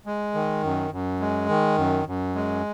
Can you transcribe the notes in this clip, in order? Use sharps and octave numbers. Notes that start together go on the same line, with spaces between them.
G#3
D#3
F#2
F#2
G#3
D#3
F#2
F#2
G#3